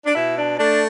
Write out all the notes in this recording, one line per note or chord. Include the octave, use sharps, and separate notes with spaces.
D4
B2 E4
D4
A3 D4